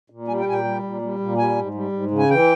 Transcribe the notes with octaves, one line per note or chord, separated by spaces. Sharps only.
A#2
G3 G#5
G5
A#2 G#5
G5
G3
A#2
G3
A#2
G3 G#5
G#2
G3
G#2
C#3
G#5
E3 G5